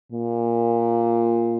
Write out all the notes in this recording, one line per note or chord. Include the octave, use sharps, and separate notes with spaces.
A#2